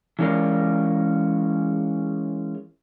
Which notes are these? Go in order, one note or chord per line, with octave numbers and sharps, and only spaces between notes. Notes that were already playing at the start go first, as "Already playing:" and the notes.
E3 G#3 C#4 F4 A#4 D5